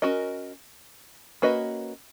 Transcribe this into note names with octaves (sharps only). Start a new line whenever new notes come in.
C#4 F#4 A#4 D#5
A#3 C#4 F#4 B4 D#5